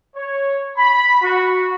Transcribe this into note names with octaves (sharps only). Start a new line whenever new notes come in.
C#5
B5
F#4